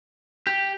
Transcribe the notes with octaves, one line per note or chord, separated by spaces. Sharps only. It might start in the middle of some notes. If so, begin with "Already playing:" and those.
G4